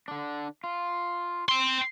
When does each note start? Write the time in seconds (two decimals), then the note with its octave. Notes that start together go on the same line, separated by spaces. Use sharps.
0.08 D3 D4
0.64 F4
1.49 G5 C6